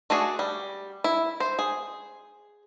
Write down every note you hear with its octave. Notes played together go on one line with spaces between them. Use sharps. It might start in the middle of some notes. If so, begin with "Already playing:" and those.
A3 D4 F#4 G#4
G3
E4
C5
G#4